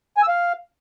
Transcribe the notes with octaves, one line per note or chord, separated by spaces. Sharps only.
G#5
E6
F5